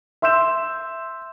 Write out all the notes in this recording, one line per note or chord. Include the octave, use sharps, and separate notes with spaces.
E5 C6 E6 G6 E7